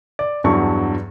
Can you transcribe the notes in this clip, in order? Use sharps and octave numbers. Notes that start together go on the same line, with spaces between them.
D5
E2 G2 F#3 A5 C#6